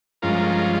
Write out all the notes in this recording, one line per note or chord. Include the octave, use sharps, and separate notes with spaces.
G2 F3 G#3 C#4 F4 A#4